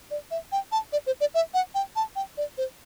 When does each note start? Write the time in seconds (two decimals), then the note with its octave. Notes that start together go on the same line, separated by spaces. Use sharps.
0.11 D5
0.31 E5
0.52 G5
0.72 A5
0.93 D5
1.06 C5
1.21 D5
1.34 E5
1.54 F#5
1.75 G5
1.96 A5
2.16 G5
2.37 D5
2.58 C5